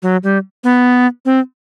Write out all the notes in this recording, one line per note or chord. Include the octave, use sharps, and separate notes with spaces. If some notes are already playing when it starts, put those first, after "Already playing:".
F#3
G3
B3
C4